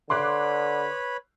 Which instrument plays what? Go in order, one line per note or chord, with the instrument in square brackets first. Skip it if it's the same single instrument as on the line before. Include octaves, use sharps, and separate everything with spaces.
[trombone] D3 [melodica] B4 C#5 B5 [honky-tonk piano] C6 D6 F#6